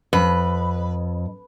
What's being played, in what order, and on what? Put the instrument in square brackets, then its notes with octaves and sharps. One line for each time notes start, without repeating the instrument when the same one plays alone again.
[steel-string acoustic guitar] F2 [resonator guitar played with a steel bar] B4